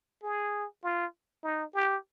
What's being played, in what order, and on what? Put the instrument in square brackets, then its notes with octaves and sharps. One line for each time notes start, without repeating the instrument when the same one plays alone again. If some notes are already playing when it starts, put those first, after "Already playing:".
[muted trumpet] G#4
F4
D#4
G4